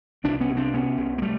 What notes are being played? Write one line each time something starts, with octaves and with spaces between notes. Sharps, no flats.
C2 C4 D4
B3 C#4
C3
C4 D4
C3 B3 C#4
C2
A#3
G3 A3